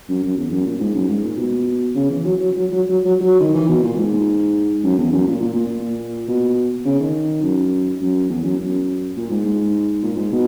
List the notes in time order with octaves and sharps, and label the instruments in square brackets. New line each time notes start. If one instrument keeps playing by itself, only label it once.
[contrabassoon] F#2
F#2
E2
F#2
A#2
G#2
F#2
G#2
A#2
B2
C#3
E3
F#3
F#3
F#3
F#3
F#3
F#3
F#3
D#3
E3
B2
A#2
G#2
F#2
E2
F#2
A#2
A#2
A#2
B2
C#3
D#3
F#2
F#2
E2
F#2
F#2
A#2
G#2
G#2
A#2
G#2
B2